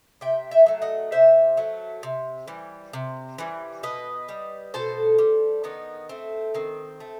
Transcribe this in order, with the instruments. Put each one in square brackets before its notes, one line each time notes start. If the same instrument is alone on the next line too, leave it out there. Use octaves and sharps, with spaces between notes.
[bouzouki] C3 E5 G5
E5 G5
F#3 A3
D#5 F#5
C3 C5 E5
F#3 A3
C3
E3 G3
C3
E3 G3
B2 B4 D#5
G3
B2 A4 C5
G3
D#3 B3 D#4
A3 C4
D#3 C4
A3